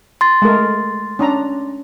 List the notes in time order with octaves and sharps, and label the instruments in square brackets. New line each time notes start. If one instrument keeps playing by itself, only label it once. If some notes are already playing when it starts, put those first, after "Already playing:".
[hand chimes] C6 A6
[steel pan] G#3 A3 A#4
C#4 D4 A#5